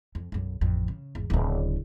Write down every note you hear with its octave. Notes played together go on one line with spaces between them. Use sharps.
F2
B1 F#2
A1 F2
C#3
G#1 E2
D1 C#3